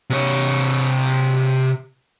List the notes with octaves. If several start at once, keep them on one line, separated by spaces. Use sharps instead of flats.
C3 C#5